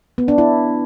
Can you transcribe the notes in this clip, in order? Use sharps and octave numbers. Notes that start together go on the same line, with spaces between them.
B3
D4
E4